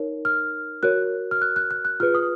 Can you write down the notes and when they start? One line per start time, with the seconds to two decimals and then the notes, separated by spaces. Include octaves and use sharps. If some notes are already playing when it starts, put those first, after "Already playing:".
Already playing: D#4 A#4 C#5
0.25 F6
0.83 F#4 A#4 C#5 F#6
1.31 F6
1.42 F#6
1.56 F#6
1.71 F#6
1.85 F#6
2.00 F4 G#4 B4 F6
2.14 D#6